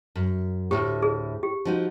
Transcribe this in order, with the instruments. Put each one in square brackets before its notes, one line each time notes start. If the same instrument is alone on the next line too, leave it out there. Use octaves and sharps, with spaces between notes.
[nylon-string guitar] F#2
[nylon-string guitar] D2 A2 [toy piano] G4
[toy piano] G#4
G4
[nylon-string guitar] F3 D#4 F#4